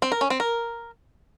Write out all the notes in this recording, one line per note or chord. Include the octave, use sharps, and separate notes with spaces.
C4
A#4
C#4
C4
A#4